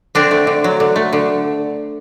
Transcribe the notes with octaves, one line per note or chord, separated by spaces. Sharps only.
D3 C4 D4
A3
D3
F#3
D3
A3
D3